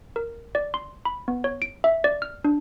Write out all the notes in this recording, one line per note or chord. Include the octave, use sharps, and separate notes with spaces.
A#4
D5
C6
B5
B3
C#5
D7
E5
D5
F6
D4